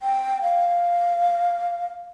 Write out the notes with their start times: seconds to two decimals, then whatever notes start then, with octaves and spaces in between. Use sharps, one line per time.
0.01 G5
0.42 F5